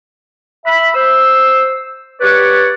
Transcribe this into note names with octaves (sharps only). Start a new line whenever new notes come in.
E5 B5
C5 E6
G4 B4 C#5 D5 F#5